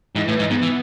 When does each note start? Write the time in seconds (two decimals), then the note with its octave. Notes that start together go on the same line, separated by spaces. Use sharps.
0.16 G#2 E3
0.28 A2
0.39 G#2
0.50 G#2 B3
0.62 E3